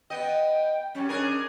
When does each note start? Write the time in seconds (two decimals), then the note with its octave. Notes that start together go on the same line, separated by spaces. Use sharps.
0.10 B3 D#5 G5
0.95 F#2 G3 C#4
1.09 D4 G#4 A#4